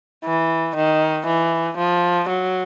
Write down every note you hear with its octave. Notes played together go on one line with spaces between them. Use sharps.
E3
D#3
E3
F3
F#3